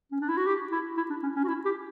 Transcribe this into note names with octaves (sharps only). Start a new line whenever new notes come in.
C#4
D4
E4
F#4
G4
E4
E4
D4
C#4
C#4
F#4
E4
G4